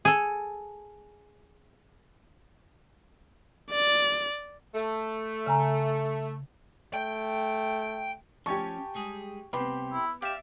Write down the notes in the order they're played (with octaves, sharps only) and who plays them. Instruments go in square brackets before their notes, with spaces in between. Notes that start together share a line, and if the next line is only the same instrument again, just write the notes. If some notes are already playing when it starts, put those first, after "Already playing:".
[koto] G#4 A4
[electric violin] D5
[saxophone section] A3
[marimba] C#3 G#5 A#5
[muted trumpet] A3 [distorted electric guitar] G5
[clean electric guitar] F3 C#4 [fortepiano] G4 G#5 C#6 [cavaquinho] A5
[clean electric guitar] G3 G#3 G#4
[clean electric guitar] C2 C4 [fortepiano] B3 [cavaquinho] G4 B5 C6
[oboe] E4
[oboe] G4 [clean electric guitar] D5 E5 [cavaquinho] F5